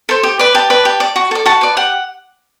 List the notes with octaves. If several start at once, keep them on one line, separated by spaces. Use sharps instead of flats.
A4 C5
G4
B4 D5
G4 A5
B4 D5
G4
D5
F#4
A4 D5
F#4 A5
B4 D5
G4 F#5